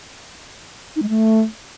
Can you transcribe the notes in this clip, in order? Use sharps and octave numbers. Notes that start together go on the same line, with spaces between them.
D#4
G#3
A3